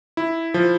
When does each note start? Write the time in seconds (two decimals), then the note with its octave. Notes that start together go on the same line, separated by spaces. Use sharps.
0.17 E4
0.54 F3